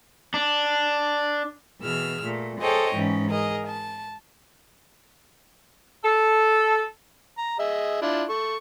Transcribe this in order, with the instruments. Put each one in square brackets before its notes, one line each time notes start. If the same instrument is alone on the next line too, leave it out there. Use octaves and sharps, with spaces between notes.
[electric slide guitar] D4
[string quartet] B2 E3 G#4 E6 F6
A#2 A3
G#4 A4 C5 C#5 D#5 G5
G#2 E3 C#4
G#4 A#4 D#5
A5
[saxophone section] A4
[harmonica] A#5
G#4 D#5 E5
D4 E4 F4
A4 C#6